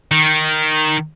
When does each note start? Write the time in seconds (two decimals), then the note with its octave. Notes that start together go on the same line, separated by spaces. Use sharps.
0.11 D#3